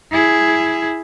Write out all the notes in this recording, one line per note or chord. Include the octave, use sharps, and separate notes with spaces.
E4 G#4